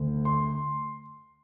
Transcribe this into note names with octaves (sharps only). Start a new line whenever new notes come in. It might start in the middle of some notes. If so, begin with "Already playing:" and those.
Already playing: D2 D3
C6